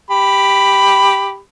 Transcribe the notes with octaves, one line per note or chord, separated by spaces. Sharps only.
G4 B5